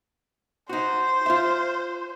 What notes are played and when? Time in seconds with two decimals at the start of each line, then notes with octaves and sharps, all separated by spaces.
0.69 D#4 F#4 C5
1.26 F4 E5